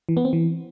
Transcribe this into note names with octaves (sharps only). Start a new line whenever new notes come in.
E3
B3
C4
E3